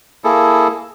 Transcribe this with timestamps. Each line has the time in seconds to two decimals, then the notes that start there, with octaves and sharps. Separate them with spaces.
0.24 A#3 E4 G#4 A4